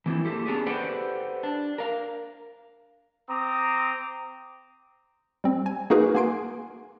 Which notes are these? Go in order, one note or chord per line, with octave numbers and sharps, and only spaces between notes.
E3 A#3 C4 E4
A#3 G4 A4
B3 C#4 D4 G4 G#4
G4 A4 B4 C5 D5 F#5
D4
A#4 F5
C4 A#5 D6 D#6
G3 C4
G#5
A#3 D#4 F#4 G#4 A#4 B4
A#3 F#5 G#5 C6 D7